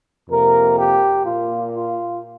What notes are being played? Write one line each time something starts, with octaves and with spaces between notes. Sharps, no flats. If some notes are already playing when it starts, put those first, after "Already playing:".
F2 C3 A#3 A#4
G4
A#2 A#3 F4
F4